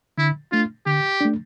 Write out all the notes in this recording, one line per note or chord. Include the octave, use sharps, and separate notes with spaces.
D3 E4
A3 D4 F4
D3 G4
A3 D4